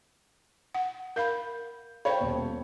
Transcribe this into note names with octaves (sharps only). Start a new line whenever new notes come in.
F#5
A#4 F5 B5 G6
C5 C#5 F5 G5 B5
D#1 B2